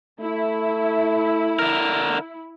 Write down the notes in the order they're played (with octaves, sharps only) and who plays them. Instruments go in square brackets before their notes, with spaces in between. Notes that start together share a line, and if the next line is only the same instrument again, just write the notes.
[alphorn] A3 [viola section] E4
[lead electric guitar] D3 A#4